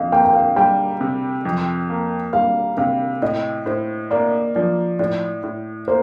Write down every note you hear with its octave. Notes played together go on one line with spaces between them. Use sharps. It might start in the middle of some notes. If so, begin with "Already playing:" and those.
Already playing: F2 D#5 F5
A#3 G5
G5
F5
G3 G5
C3
F2
A#3
G3 F5
C3 F5
A2 D#5
A2 C5
A#3 D5
F3 D5
A2 D5
A2
A#3 C5